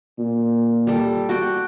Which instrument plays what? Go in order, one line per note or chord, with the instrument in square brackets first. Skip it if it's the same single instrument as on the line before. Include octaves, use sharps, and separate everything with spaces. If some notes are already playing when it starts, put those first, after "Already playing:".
[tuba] A#2
[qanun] G3 A4
F#4 G5